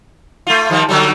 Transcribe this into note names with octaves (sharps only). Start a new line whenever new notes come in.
A3 F4
D#3 F3 G3
D3 F#3 G3